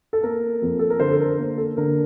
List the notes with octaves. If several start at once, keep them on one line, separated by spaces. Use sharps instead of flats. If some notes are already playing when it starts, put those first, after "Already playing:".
A4
A#3 A#4
F2
A4
A#4
D3 A4 C5
A4
A#4
A#3
A4
D3 A#4